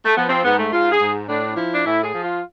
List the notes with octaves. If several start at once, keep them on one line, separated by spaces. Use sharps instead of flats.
A3
F3 B3
C4
G#2 B3
A3
G#2 F4
G#4
G#2
A2 D4
F3 E4
D4
A2 E4
G#4
F3
F4